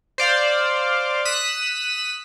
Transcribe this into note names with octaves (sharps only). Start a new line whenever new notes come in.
C5 D5 F5
D#6 F#6 B6 E7